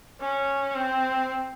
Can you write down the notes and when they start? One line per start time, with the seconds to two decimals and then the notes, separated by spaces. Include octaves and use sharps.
0.21 C#4
0.75 C4